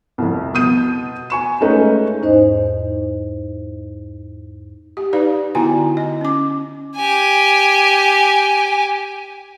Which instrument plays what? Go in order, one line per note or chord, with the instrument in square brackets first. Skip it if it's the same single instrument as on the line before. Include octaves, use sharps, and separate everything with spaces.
[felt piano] C2 F2
B2 D#6 G6 D#7
G#5 C#6 E7
G#3 A3 C#4 D#4 B4
[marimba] E2 G#2 D#4 C5 D#5
[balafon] G4
D#4 B4 D5 F5
D3 B3 E4 F#4 G5 G#5
D#5
C#4 D6
[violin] G4 G#5